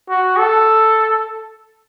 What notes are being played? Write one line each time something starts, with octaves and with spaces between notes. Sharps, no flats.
F#4
A4